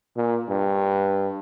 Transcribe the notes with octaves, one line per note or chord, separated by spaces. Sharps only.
A#2
G2